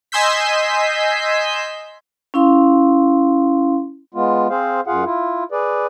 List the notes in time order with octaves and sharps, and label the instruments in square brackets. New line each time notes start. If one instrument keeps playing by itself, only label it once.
[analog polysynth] D#5 G#5 C6 E6 G6 B6
[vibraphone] C#4 E4 F5 C6
[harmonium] G#3 B3 F4
C4 G#4 C5 F5
F#2 F4 G#4 F5 F#5
E4 F4
G#4 B4 D5